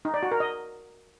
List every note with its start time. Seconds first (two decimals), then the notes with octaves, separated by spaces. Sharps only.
0.05 D#4
0.14 D5
0.23 F#4
0.31 A#4
0.40 D#5